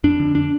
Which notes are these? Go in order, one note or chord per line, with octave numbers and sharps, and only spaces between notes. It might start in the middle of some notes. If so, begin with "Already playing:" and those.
F2 D4
D3
D4